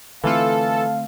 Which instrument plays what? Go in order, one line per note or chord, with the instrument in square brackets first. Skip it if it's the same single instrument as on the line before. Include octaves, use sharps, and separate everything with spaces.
[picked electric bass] D3 A3 C4 [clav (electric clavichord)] E3 F4 [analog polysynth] A4 [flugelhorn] F5